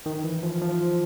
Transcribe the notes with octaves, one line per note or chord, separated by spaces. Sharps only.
D#3
E3
F3
F3